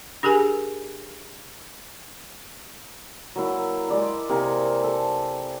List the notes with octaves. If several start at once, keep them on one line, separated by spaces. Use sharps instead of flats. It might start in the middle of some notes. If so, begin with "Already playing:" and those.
D4 G4 G#4 A#4 G#5
F#3 A#3 E4
G#3 D5 B5
C3 A#3 G#4 G#5
A4